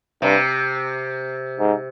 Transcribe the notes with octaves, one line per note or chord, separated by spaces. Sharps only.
G2 C3
G#2